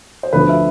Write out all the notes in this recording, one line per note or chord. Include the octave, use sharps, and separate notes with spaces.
C5
D2 D3 F3 A3 B4
E5